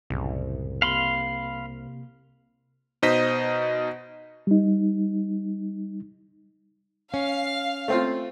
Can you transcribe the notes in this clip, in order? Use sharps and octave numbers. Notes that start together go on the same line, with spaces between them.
C2 F#2 A2 C#3
C3 A#3 F5 B5 C6
B2 D#4 C5 D#5 B6
G3 D#4
C#4 F5
A3 C4 F4